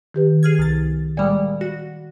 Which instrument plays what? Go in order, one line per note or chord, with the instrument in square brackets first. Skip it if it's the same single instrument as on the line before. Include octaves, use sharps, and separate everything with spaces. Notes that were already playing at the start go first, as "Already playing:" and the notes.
[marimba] D#3 G4 B4
[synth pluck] G#4 F6 G#6
C2 A6
[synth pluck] A#2 G3 G#3 [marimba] D5
[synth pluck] F#4